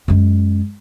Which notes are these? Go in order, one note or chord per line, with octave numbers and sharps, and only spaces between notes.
F#2 G#3